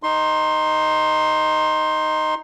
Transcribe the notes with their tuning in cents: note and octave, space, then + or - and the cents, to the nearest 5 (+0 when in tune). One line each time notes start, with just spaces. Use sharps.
D#4 +0 C6 +20